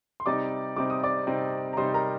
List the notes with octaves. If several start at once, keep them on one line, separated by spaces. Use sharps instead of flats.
C6
C3 G3 C4 D#4 D5 D6
C3 G3 C4 D#4 D6
D#6
D5 D6
C3 G3 C4 D#4
A#5
C3 G3 C4 D#4 C5 C6
A#4 A#5